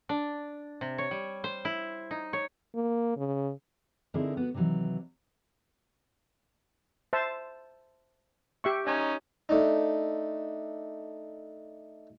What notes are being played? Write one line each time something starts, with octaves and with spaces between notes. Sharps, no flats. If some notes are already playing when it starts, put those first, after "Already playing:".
D4
C3
C#5
G3
C5
E4
D#4
C#5
A#3
C#3
D3 C4 D#4 E4 G#4 A#4
B3 F#4
C3 D#3 E3 F#3
C5 E5 A5
G4 E5 C#6
C#4 D#4 G#5
A3 D4 D#4